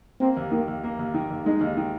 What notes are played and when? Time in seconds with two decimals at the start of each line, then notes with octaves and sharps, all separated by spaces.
0.20 A#3 C4
0.37 D#2
0.51 D#3 A#3
0.68 D#2
0.84 A#3
0.99 D#2
1.14 D#3
1.30 D#2
1.46 G#3 D#4
1.61 D#2
1.77 D#3